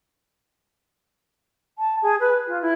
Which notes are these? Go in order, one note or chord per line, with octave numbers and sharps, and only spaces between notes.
A5
G#4
B4
F4
E4